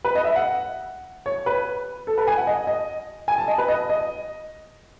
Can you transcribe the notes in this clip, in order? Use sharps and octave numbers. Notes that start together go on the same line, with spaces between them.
B4
D#5
E5
F#5
C#5
B4
A4
B4
G#5
F#5
D#5
D#5
G#5
A5
D#5
B4
D#5
D#5